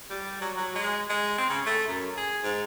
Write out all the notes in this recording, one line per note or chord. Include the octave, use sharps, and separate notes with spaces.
G3
F#3
F#3
G#3
G#3
C4
C#3
A3
F#2
G#4
G#2